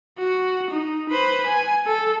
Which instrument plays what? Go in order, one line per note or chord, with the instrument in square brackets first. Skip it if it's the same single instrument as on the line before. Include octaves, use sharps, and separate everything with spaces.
[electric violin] F#4
D#4
B4 C5
G#5
A4